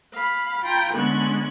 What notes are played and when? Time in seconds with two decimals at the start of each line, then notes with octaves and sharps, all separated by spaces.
0.13 F5 B5
0.63 F4 G5 A#5 B5
0.94 D3 G#3 B3 C#4 C#6 F#6